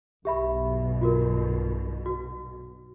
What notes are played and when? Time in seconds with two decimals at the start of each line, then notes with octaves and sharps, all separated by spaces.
0.25 B1 G2 B2 G4 E5 B5
1.01 F4 F#4 A#4
2.06 F#4